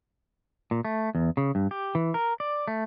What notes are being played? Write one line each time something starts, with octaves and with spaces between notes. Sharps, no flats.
A#2
A3
E2
C#3
G2
G4
E3
A#4
D5
A3